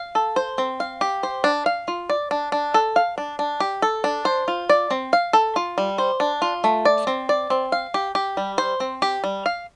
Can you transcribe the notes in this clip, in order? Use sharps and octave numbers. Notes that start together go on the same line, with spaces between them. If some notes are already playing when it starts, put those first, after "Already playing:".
Already playing: F5
A4
C5
C4
F5
G4
C5
D4
F5
F4
D5
D4
D4
A4
F5
D4
D4
G4
A4
D4
C5
F4
D5
C4
F5
A4
F4
G3
C5
D4
F4
A3
D5
C4
D5
C4
F5
G4
G4
G3
C5
C4
G4
G3
F5